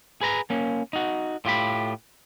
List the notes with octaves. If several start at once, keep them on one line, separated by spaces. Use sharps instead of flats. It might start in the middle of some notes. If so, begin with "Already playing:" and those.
G#4 B4 A#5
A#3 C#4
D#4 F#4
A2 F4 G4 B5